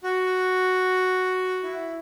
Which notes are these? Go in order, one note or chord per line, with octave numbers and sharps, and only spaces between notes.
F#4
E4